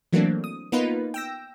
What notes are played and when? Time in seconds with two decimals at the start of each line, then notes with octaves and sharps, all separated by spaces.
0.13 E3 F#3 A3 A#3 C4 D4
0.44 D#6
0.72 A#3 B3 D#4 F4 B4
1.14 G5 E6 A#6